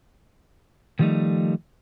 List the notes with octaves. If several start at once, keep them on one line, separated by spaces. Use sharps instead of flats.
D#3 F3 G3 A3 D#4